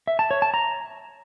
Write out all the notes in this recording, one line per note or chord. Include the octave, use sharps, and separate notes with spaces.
E5
A5
C#5
A5
A#5